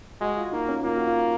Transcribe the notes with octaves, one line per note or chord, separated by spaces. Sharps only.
G#3 F#4
F4
A#3 D#4
C#4
A#3 F4
F#4
F4